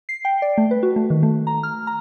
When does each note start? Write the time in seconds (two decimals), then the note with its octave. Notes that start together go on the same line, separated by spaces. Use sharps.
0.09 C7
0.25 G5
0.42 D5
0.58 A3
0.71 B4
0.83 F#4
0.96 A3
1.10 D#3
1.23 A3
1.47 A#5
1.63 F6
1.87 A#5